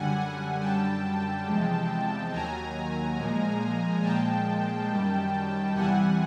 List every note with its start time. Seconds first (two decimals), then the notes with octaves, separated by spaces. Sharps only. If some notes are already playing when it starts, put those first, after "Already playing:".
Already playing: F#2 D3 G3 F#5 G#5
0.19 F#5 G#5
0.60 F#2 D3 G3 G5 A5
1.46 E2 C3 F3 G#3
2.32 D#2 D#3 F#3 G#5 A#5
3.17 A#2 F3 G#3
4.03 A#2 F3 G#3 G5 A5
4.89 F#2 D#3 G3
5.74 E2 C3 E3 G3 F#5 G#5